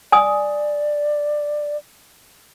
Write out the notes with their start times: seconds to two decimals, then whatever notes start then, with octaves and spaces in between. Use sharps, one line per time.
0.12 D5 G#5 D#6